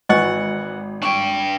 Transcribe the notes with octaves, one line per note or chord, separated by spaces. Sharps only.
G#1 E3 D#5 F#5 C#6
D4 G5 C#6